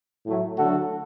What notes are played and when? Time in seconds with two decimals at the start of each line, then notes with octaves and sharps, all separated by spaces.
0.25 A2 F#3 A3
0.57 D3 F#3 A3 F#4 A4